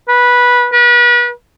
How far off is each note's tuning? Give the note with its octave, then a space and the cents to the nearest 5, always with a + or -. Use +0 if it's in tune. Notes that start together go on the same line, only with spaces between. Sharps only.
B4 -15
B4 -35